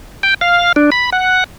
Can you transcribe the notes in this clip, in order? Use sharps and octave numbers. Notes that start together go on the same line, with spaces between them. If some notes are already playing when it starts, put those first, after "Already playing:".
G5
F5
D4
B5
F#5